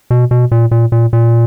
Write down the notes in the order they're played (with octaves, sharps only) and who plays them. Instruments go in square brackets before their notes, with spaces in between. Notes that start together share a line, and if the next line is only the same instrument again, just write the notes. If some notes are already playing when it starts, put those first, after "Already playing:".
[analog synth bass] B2
B2
A#2
A#2
A#2
A#2